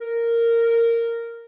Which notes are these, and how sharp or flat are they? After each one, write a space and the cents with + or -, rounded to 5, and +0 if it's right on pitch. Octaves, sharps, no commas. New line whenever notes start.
A#4 -10